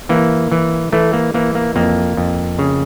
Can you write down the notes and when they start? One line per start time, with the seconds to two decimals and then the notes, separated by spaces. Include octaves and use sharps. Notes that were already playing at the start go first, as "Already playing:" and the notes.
0.09 E3 A#3
0.52 E3
0.92 E3 A3
1.13 A#3
1.34 E3 A#3
1.55 A#3
1.76 F2 A#3
2.17 F2
2.59 C#3